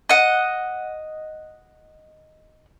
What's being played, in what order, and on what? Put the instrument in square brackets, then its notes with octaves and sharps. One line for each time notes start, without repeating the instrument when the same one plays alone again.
[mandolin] D#5 F#5